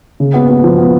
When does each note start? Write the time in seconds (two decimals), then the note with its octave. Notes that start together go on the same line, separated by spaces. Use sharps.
0.20 C#3
0.34 B3
0.48 B3
0.64 F3
0.78 B3